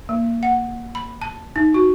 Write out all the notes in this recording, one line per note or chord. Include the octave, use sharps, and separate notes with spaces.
A#3
F#5
B5
A5
D#4
F#4